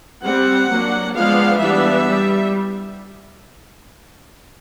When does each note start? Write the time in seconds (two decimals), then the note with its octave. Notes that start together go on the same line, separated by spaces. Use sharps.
0.23 G3 C4 F#5
0.70 F#3 A#3 D4
1.14 F3 G#3 B3 D4 F5
1.60 E3 G3 B3 D4 E5
2.07 G3